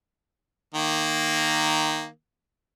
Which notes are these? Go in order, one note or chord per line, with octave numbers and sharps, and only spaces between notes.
D#3 A#3